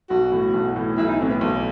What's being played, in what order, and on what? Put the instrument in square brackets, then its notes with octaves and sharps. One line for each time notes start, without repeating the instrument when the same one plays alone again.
[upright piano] B1 [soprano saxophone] F#4
[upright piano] A2 E3
B1
A2 E3
[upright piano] B1 [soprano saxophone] E4
[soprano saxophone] D#4
[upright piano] A2 E3 [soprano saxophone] C4
[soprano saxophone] B3
[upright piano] B1